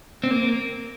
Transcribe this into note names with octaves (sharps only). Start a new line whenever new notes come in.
C4
A#3